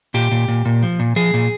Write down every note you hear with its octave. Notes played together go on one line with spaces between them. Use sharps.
A#2 G4
A#2
A#2
A#2
F3
A#2
F3 G#4
A#2